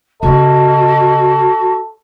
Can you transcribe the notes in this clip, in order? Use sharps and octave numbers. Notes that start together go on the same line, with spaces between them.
C#3 C#4 F#4 A4 D#5